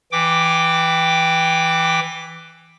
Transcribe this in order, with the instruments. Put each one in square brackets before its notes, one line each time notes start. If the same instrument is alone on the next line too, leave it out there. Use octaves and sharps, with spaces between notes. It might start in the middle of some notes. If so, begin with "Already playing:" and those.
[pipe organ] E3 G5 D6